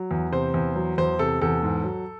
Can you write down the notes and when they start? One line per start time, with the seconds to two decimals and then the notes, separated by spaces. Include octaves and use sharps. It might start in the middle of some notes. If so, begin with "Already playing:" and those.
Already playing: F#3
0.11 E2
0.32 C3 C5
0.54 E2
0.76 F#3
0.98 E2 C5
1.19 C3 A4
1.41 E2 A4
1.63 G#2
1.84 F#3